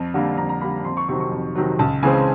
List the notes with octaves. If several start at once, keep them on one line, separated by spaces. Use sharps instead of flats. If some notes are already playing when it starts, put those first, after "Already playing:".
Already playing: F2
D3 G3 A#3
F2 A#5
A#5
D3 G3 A#3 B5
F2 C6
C#6
C3 D#3 F#3 C#6
C#6
F2
C3 D#3 F#3
C#2 A5
C#3 E3 G#3 C4 G#5